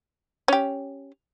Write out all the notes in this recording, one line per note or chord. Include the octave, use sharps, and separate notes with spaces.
C#4 G4